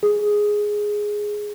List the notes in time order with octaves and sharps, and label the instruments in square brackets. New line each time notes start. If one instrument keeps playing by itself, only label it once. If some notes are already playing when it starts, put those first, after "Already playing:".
[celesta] G#4